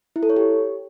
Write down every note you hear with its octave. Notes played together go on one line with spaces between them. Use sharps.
E4
A4
C#5
G4